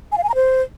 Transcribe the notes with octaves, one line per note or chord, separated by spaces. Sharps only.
G#5
F5
G#5
A#5
C5